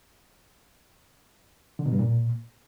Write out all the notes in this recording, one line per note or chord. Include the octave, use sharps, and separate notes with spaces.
D3
B2
G2
A#2